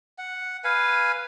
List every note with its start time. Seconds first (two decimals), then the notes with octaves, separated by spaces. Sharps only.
0.18 F#5
0.64 B4 F5 G#5